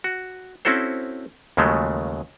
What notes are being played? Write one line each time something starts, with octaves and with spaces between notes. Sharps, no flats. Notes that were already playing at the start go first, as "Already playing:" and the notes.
F#4
C4 C#4 E4 F#4 A4 C5
D#2 C#3 F3 F#3 G#3 A3